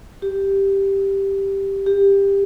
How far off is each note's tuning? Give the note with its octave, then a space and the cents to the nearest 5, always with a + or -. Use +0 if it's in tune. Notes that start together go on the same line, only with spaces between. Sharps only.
G4 +0
G4 +15